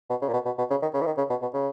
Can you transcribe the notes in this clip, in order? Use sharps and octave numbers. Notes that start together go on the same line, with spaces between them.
B2
C#3
A#2
B2
B2
B2
C#3
D#3
C#3
E3
D#3
C#3
B2
B2
C#3